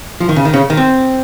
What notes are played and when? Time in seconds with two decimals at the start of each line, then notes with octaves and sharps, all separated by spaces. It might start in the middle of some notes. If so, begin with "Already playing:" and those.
0.20 F3
0.29 D#3
0.36 C#3
0.45 D#3
0.54 C#3
0.70 D#3
0.77 C4